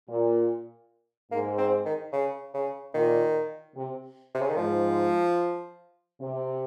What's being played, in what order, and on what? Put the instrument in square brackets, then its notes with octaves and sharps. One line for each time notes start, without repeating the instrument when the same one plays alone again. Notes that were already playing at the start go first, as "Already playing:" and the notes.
[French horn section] A#2
[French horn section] G#2 [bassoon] A#3
[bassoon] C4
D#3
C#3
C#3
[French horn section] A#2 [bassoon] D#3
[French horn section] C3
[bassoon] C3
C#3
D#3
[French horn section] G#2 [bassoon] F3
[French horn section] C3